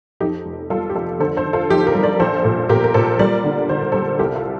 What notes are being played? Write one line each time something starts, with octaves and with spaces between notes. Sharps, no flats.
F2 D#4 G4
F1
G3 F4 A4
G4
F1 F4 A4
D3 A4 C5
A4 C5
D3
F4 A4
F2 D#4 G4
G4 A#4
G3
A#4 D5
A#1 A4 C5
A#2
A#2 G4 A#4
A#4
A#2 A4 C5
G3 A#4 D5
D3
D3 C5
A#4
G3 A4 C5
C2 G4 A#4
F4 A4